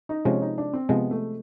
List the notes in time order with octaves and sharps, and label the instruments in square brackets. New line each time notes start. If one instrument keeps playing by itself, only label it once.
[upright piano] D#4
[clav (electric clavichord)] C3 F3 G#3 [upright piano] C#4
[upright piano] D#4
D4
C4
[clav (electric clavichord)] C3 F3 G#3 [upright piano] B3
[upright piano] A3